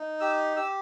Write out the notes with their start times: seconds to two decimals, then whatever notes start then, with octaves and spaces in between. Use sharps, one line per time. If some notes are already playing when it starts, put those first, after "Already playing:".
Already playing: D#4
0.20 G4 E6
0.56 G4 E6